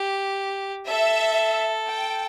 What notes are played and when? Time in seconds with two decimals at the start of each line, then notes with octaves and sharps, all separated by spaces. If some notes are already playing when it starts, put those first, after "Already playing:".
Already playing: G4
0.87 A4 E5
1.90 G5